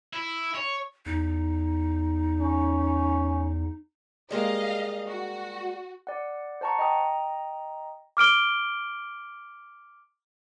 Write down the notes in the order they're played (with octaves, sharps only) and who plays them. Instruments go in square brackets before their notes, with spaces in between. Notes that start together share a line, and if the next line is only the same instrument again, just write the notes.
[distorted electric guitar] E4
C#5
[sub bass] E2 [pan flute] D#4
[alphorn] C#4
[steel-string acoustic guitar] G3 G#3 A#3 [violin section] D#5 F5
[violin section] F#4
[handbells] D5 F#5
C5 F#5 A5 A#5 C#6
D#5 G5 A#5 D#6
[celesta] D6 F6 D7 G7